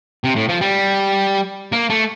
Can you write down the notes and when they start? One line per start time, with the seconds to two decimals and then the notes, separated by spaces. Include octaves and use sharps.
0.24 C3
0.36 A2
0.49 F3
0.61 G3
1.72 A#3
1.90 A3